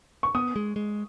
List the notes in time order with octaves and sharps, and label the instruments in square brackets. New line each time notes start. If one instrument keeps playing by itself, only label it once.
[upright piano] C#6
[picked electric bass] B3 [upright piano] D#6
[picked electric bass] G#3
G#3